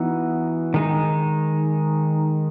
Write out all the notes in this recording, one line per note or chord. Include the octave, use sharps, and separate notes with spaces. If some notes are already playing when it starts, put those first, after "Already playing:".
Already playing: E3 B3 D#4 F#4
D#3 G#3 D#4